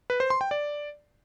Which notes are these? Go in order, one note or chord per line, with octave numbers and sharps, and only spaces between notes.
B4
C5
C6
G5
D5